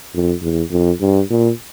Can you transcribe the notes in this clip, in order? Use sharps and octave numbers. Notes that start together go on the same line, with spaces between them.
F2
E2
F2
G2
A#2